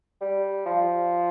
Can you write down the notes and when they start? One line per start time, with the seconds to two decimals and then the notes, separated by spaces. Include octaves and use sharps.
0.21 G3
0.66 F3